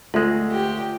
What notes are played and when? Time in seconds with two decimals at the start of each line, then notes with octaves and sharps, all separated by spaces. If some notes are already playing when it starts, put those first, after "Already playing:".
0.14 D2 G#3 A3 F4
0.52 G4